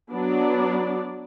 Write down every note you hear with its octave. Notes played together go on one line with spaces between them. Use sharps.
F#3 B3 D4 D5